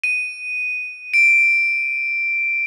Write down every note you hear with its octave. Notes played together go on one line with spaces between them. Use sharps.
D#7
D7